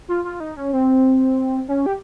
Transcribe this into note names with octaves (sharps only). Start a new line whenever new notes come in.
F4
F4
D#4
C#4
C4
C#4
G4